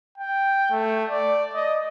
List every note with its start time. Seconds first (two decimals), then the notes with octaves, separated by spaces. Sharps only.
0.18 G5
0.71 A3
1.10 D5
1.54 D#5